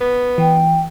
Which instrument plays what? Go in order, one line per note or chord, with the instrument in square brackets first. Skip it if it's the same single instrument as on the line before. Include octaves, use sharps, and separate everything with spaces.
[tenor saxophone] B3
[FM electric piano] E3 [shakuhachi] G5